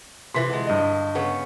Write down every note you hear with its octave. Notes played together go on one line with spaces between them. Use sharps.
C3 E3 F4 C6 B6
D3 G#3
G2 D#5
C#3 B3 C#4